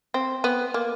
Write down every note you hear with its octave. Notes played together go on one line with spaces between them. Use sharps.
C4
B3
A#3